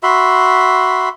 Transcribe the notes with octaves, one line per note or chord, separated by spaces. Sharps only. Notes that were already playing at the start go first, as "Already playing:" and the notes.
F#4 E5 B5 C6